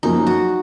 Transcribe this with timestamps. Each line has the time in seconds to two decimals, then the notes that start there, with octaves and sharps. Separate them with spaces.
0.03 F#2 F3 A#3 D#4
0.27 F#4